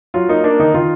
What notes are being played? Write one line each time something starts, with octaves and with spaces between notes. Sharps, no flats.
F#3 F4
A#3 D#4
A#3 D4
D#3 D#4
D#3 F4